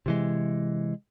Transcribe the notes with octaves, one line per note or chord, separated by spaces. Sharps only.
C3 E3 G#3